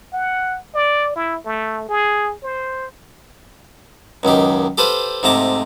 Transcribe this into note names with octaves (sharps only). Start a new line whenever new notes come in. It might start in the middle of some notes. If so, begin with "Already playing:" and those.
F#5
D5
E4
A3
G#4
C5
C#2 F#2 D#3 G4
G4 A4 B4 C5 F5
G#2 C3 A3 A5 A#5 D6